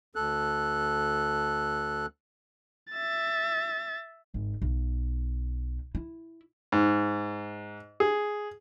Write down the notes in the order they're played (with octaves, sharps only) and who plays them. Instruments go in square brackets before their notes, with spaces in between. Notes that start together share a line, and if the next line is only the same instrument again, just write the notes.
[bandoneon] D2 A4 F#6
[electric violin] E5 A6
[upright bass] G#1
B1
E4
[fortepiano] G#2
G#4